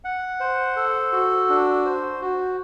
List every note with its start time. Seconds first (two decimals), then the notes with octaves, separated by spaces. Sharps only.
0.04 F#5
0.40 C5
0.76 A4
1.12 F#4
1.49 D4
1.86 C5
2.21 F#4